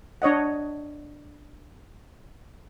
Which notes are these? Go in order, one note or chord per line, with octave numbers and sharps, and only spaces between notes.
D4 C#5 D#5 F#5